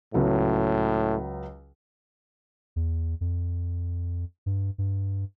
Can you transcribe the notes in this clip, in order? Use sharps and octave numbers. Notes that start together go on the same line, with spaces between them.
C#2 A2 F#3
E2
F2
G2
G2